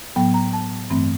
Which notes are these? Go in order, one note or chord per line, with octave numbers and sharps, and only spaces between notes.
A2 F#3 B3 G5
A#5
A5
G2 E3 A3 C4